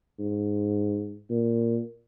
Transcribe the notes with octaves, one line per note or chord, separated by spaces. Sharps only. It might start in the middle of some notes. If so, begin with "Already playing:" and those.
G#2
A#2